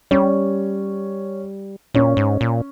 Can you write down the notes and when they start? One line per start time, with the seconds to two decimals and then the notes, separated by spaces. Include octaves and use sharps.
0.11 G3 C#4
1.94 A#2 C#4
2.17 G#2
2.41 A#2